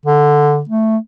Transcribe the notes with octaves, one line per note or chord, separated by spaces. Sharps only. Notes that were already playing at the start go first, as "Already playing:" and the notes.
D3
A3